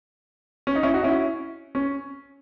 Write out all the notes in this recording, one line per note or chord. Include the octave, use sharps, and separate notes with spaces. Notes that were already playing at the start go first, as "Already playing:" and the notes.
C#4
D#4
C#4 E4
D#4 F#4
C#4 E4
C#4